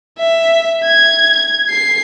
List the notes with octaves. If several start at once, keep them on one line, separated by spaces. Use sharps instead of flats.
E5
G#6
C7